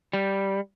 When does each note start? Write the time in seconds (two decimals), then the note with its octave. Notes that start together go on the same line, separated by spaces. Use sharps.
0.13 G3